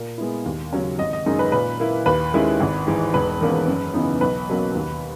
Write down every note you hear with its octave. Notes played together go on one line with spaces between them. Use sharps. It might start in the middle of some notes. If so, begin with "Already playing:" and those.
Already playing: A#2 A#4
G#3 B3 E4
D#2
C#3 F#3 C#4
G#1 D#5
D#5
F#2 D#3 G#3 D#4
B4
A#2 B4
A#3 E4
D#2 B4
D#3 G#3 C#4 E4
G#1
G#2 E3
E1 B4
E2 D#3 A#3 C#4
F#2
C#3 E3 B3 D#4
B1 B4
B2 F#3 A#3 C#4
D#2